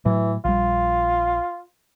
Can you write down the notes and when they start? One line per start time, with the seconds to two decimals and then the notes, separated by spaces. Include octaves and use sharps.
0.05 A2 E3 F#3
0.45 A#1 G3 F4